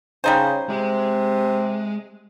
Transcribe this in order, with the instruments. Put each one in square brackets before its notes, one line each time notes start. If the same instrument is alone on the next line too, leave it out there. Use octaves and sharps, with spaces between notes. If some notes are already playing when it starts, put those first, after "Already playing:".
[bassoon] C#3 [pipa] G3 D#4 C5
[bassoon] C3 [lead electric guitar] G#3